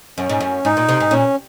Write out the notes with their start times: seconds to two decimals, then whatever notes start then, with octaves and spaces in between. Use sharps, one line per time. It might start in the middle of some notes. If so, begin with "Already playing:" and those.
0.18 F#2 C#4
0.29 G#2
0.40 F#2
0.65 G#2 D#4
0.77 A#2
0.89 C3
1.00 G#2
1.11 A#2 C#4